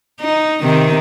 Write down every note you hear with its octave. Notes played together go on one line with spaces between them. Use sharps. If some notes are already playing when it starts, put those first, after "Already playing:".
D#4
C3 D#3